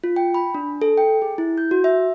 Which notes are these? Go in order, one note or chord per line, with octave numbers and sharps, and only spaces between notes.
F4
G5
B5
D4
A4
G5
G#4
E4
G6
F#4
E5